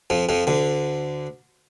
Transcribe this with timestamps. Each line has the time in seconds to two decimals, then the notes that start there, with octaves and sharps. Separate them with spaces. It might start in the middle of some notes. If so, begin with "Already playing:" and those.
0.10 F2 F3
0.29 F2 F3
0.47 D2 D3